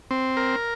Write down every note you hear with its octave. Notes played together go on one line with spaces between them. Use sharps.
C4
A#4